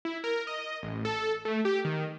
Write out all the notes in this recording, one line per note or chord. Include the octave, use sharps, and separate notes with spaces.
E4
A#4
D#5
A1
A4
A3
G4
D#3